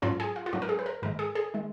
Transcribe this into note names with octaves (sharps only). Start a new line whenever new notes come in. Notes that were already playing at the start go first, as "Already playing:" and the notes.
G#2 F#3 C#4 F4
G#4
F4
F4
G#2 F#3 C#4 F#4
A#4
G#4
B4
A#4
G#2 D#3 G#3 A#4
G#4
G#4
D#3 G#3